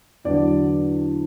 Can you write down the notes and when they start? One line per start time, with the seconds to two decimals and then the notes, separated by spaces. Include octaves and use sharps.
0.25 E2 D3 F#3 D5